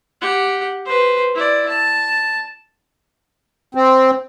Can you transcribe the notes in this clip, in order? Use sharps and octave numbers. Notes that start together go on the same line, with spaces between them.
G4 F#5
B4 C5
E4 D5
A5
C4